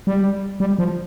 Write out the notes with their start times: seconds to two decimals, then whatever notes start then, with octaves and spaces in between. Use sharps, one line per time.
0.07 G3
0.60 G3
0.79 F3